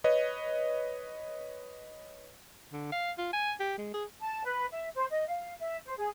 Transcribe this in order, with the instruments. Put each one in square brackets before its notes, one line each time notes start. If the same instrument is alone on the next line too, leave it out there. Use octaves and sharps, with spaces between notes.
[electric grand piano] B4 C#5 D#5
[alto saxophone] D3
F5
F4
G#5
G4
G#3
G#4
[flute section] A5
B4
E5
C5
D#5
F5
E5
C5
G#4